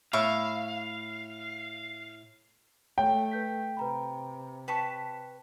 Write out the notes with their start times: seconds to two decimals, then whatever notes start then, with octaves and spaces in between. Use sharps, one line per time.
0.13 A2 E5 F5 C#6
2.98 A3 C#5 G5
3.31 B4 G6 B6
3.77 C3 B4 A#5 B5
4.68 B4 G5 A5 C#6 B6